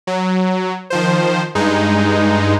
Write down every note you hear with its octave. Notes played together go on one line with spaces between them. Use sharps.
F#3
D#3 F3 C5
G2 G#3 D#4